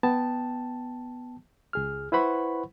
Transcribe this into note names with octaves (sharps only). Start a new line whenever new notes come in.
B3 G5 A5
C#2 G#4 F6
E4 B4 C5 F#5 B5 C#6